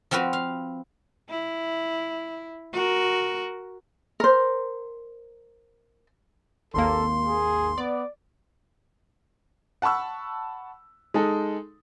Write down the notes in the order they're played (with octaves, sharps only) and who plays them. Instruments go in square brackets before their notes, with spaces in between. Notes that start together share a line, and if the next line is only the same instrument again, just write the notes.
[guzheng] F3 C4 F4 F#4 B4
F5
[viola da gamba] E4
F#4 A#4
[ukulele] A#4 C5
[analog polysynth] G#1 D#2 A#3 [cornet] A4 [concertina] C6
[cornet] G#4
[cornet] B3 [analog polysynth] D5
[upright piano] F#5 A5 B5 C#6 E6
G#3 D#4 A4